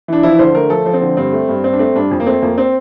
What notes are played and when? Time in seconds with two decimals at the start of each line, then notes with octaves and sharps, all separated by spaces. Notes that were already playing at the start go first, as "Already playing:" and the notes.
0.08 E3 D4
0.23 F3 E4
0.39 D3 C5
0.55 A3 A#4
0.70 F3 A4
0.86 F3
0.94 C4
1.01 D3
1.17 G2 C4
1.33 A3
1.49 G2
1.64 G2 C4
1.73 D4
1.79 A3 C4
1.95 G2 D4
2.11 F2
2.20 A#3
2.26 A3 C4
2.42 F2 A#3
2.58 C4